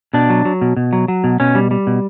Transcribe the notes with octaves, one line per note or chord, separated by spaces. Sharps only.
B2 D4
F#3
F#3
B2
B2
F#3
F#3
B2
B2 C#4
G3
G3
B2